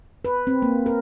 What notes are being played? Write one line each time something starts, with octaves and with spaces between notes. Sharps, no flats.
B4
C4
A#3
A#4